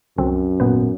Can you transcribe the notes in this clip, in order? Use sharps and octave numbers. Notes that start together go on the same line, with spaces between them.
C2 F#2 D3 C4
G#1 A#2 B3 B4